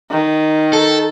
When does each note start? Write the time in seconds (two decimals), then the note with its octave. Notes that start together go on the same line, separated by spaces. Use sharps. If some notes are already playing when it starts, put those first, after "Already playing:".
0.11 D#3
0.73 A4